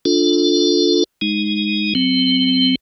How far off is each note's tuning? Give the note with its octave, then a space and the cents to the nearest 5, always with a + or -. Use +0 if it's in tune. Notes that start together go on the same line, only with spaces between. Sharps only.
D4 +0 F4 +15 A4 +0
G#3 +0 D#4 +0
F#3 +5 C4 -20